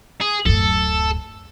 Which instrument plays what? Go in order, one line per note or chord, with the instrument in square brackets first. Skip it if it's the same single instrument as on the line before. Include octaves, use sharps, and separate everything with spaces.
[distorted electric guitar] G#4
[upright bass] D1 F#2 [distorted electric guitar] A4